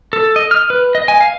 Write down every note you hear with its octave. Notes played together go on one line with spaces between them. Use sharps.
A4
D#5
F6
B4
D#5
G#5
F5